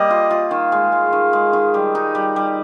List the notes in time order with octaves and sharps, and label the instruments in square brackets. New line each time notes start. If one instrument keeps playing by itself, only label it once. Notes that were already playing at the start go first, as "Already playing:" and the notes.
Already playing: [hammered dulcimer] G3 A#3 [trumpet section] D#5
[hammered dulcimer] F4
F4
[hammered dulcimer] D#3 [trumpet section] F5
[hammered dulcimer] G#3
G#3
D#3
G#3
D#3
[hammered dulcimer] G3 [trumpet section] D#5
[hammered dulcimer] D#4
G3
G3